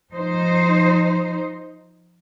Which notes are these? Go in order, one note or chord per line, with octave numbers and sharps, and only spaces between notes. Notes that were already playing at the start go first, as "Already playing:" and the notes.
F3 D#4 C5